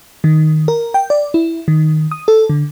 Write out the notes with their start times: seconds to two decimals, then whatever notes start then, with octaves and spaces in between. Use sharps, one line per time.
0.24 D#3
0.68 A#4
0.94 G5
1.10 D5
1.34 E4
1.68 D#3
2.11 D#6
2.28 A4
2.50 D3